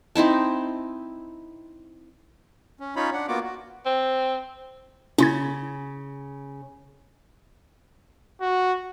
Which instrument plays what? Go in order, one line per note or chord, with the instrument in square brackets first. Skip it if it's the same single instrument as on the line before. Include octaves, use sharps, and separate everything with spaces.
[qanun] C4 D#4 E4 A5
[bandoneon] C#4
C#4 D#4 F4 C#5 B5
D4 F#5
A#3 B3 F4 F#4 D6
F#4
[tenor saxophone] C4
[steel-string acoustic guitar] C#3 [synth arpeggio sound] C#4 E4 G#6
[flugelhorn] F#4